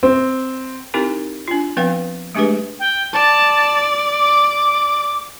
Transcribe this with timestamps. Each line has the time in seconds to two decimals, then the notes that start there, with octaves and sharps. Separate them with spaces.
0.03 C4
0.94 C4 D#4 E4 G4 A#4
1.48 D4 F4
1.77 F3 B3 C4 B4 F5 G5
2.35 G#3 A3 D4 G4 G#4 B4
2.79 G5
3.13 D5 A5
4.19 D6